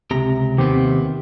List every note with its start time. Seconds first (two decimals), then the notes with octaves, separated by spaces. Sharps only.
0.11 C#2 C3 G4 A#5
0.58 D#2 C3 D#3 B3 C4 G4